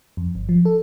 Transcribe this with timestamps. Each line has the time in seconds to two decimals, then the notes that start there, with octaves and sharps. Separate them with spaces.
0.17 F2
0.35 G1
0.49 F3
0.65 A4